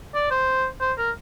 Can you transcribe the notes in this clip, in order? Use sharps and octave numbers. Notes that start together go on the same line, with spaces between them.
D5
C5
C5
A#4